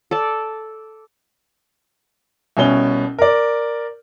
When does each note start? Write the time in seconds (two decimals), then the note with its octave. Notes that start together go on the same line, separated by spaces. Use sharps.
0.11 A4 D5 A5
2.57 C2 B2 C#4 G7
3.18 A#4 D5